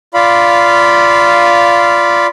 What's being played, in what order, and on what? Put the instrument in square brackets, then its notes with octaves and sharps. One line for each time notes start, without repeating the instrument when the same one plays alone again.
[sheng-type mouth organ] F4 D5 F5 B5